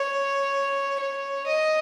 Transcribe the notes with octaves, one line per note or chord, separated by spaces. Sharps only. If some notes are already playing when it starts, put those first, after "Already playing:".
Already playing: C#5
C#5
D#5